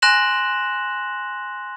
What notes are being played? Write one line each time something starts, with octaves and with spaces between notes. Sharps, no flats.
G#5 C6 F#6 A#6 E7 F#7